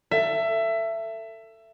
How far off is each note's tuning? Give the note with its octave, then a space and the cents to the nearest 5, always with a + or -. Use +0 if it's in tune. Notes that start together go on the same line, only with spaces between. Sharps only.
A4 +25 E5 +20